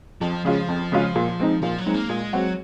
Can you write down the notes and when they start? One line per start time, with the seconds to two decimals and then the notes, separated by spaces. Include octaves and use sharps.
0.21 F2 F3
0.45 C#3 F3 G#3 C#4 F4
0.68 F2
0.92 C#3 G#3 C#4 F4
1.16 A#2
1.40 G#3 C4 D#4
1.62 A#2 F3
1.78 F#3
1.86 G#3 C4 D#4
1.94 A#3
2.09 A#2 G#3
2.33 F#3 G#3 C4 F#4